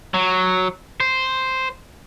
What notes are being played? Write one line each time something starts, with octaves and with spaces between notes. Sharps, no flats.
F#3
C5